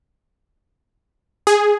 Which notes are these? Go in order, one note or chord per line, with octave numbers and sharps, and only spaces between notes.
G#4